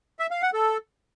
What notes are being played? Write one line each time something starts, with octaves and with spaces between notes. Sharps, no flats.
E5
F5
F#5
A4